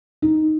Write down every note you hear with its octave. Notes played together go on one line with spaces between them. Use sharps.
D#4